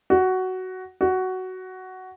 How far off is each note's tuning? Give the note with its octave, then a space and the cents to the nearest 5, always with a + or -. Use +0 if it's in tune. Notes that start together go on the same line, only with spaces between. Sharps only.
F#4 +10
F#4 +10